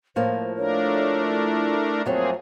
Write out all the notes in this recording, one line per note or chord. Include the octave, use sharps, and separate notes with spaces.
A2 F3 A#3 C5
A3 D4 A#4 C#5
E4
F2 F#3 A3 A#3 C4 G#4 C5